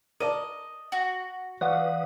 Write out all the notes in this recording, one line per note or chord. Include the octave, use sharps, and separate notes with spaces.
A#4 D5 D#5 A5
F#4
E3 B4 D5 F5 F#5 C#6 D#6